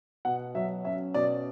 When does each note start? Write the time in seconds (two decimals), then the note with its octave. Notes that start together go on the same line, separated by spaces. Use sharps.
0.25 B2 F#5
0.55 F#3 E5
0.84 C#4 E5
1.14 B2 D5